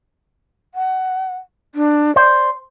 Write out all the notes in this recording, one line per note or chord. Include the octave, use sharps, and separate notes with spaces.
F#5
D4
C5 D5